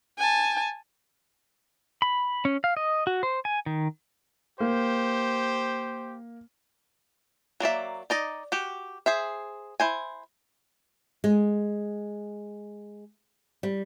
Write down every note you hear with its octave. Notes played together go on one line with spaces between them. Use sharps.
G#5 A5
B5
C#4
F5
D#5
F#4
C5
G#5
D#3
A#3 G4 C5
F#3 A#3 D5 E5
D#4 D5 D#5
F#4 G4
G#4 C5 E5
E4 C5 G#5
G#3
G3